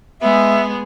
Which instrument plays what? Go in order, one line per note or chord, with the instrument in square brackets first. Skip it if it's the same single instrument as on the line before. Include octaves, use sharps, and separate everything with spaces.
[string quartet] G#3 B3 G#4 [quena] E5